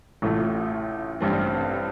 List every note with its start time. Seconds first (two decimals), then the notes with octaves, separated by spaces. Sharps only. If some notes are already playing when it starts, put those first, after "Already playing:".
0.22 A1 A2 A3 F4
1.20 A1 G2 G3 C4